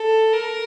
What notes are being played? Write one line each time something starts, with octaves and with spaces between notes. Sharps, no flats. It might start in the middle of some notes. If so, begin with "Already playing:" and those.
Already playing: A4
A#4